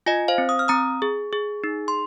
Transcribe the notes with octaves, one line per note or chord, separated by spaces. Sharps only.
F4 D#5 G#5
C5 F5
C4
D#6
F6
C4 A#5 D#6
G#4
G#4
D#4
C6